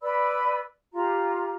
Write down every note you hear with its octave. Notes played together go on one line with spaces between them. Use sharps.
B4 D5 B5 E6
F4 G4 A#5